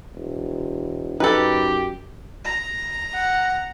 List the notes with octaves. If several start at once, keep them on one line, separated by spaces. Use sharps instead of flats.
E1
F#2 D#4 G4 A4 B4
A#5
F#5